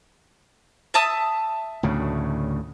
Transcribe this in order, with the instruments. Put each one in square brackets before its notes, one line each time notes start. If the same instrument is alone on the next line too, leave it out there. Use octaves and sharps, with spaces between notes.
[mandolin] E5 A5 D#6
[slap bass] D2 A2 C#3